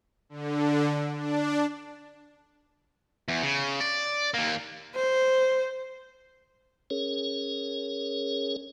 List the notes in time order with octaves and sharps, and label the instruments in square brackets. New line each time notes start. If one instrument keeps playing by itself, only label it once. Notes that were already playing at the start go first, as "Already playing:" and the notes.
[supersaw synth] D3
D4
[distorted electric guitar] E2
C#3
D5
D#2 A#3
[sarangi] C5
[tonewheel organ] C#4 G#4 A#4 C#5